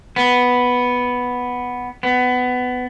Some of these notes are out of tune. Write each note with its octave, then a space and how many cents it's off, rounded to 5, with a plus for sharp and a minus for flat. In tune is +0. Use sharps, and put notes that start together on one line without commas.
B3 +0
B3 +20